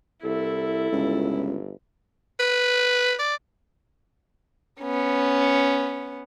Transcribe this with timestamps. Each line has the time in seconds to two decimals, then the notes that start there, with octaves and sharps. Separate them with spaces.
0.24 C2 E4 A4
0.92 G1 C#2
2.40 B4
3.19 D5
4.81 B3 C#4